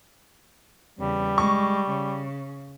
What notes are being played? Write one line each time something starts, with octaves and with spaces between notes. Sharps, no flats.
E2 C#3 G3
G#3 C#6
C#3